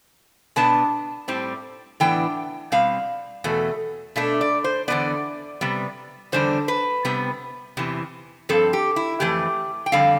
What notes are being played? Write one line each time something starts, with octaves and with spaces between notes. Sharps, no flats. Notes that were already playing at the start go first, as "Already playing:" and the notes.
B2 B3 D4 A5
A2 G3 C4
A2 E3 B3 D4 G5
B2 G3 C4 F5
E2 B2 A3
B2 A3 D4 E5
D5
C5
E2 D3 F3 B3 D5
C3 G3 B3
E2 D3 G3 D4 C5
B4
C3 G3 B3
E2 C3 E3
G2 F3 C4 A4
G4
E4
F2 E3 A3 G4
G5
F2 D3 G3 C4 F5